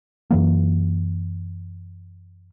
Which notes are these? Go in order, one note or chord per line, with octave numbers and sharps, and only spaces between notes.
F#2 E3 A#3